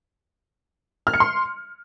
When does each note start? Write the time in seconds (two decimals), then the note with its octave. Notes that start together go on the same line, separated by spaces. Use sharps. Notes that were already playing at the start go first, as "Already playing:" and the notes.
1.07 F6
1.14 C#7
1.20 C6